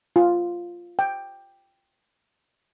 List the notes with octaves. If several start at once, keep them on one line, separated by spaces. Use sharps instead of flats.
F4
G5